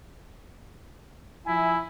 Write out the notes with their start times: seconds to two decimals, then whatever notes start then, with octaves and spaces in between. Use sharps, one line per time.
1.46 F3 E4 E5 G#5